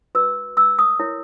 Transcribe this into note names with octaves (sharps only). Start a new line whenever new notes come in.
F#4 B4 E6
E6
D#6
E4 A#4 C#5